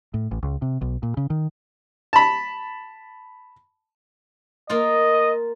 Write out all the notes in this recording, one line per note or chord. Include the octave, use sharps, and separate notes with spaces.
A2
A1
C#2
C3
B1
A#2
C#3
D#3
A5 B5
A#3 F4 D#5